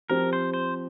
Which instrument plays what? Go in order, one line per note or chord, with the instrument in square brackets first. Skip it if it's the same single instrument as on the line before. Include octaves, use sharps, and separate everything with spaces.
[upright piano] F3 C4 G4 [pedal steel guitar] A#4
[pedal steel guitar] C5
C5